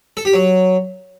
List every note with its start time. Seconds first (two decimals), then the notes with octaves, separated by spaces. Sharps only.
0.17 A4
0.25 G4
0.33 F#3